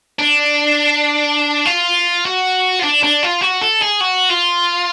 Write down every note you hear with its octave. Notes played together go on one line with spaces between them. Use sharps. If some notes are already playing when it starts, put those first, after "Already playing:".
D4
F4
F#4
F4
D4
D4
F4
F#4
A4
G#4
F#4
F4